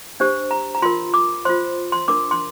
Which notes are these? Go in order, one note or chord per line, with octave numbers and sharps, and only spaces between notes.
D4 G4 C5
A#5
A#5
F4 A#4 C6
D6
F4 C5 C6
C6
D4 A#4 D6
C6